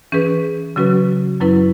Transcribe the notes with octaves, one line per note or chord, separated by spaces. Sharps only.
E3 C#4 G#4 B4
C#3 F#3 C#4 F#4 B4
F#2 F#3 C#4 E4 B4